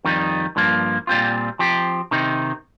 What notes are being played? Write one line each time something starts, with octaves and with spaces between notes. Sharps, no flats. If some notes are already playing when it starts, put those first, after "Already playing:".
F2 D#3 G3 D#4
G2 F3 A#3
A#2 G3 C4 F4
F3 C4 G4
C3 D#3 C4 D#4